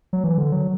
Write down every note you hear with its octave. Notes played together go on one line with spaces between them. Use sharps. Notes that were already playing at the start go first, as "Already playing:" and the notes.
F#3
E3
D3
F#3